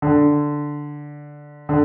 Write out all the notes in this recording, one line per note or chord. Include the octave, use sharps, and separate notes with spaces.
D3
D3